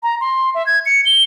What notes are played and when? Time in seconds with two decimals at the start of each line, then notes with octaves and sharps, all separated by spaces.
0.03 A#5
0.21 C6
0.55 E5
0.66 G#6
0.86 C#7
1.05 G7